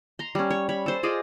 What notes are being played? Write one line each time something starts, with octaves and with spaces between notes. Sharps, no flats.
A#5 C6
G3 C#4
C#5
C#5 B5
A4 C5
F4 G#4 D5 D#5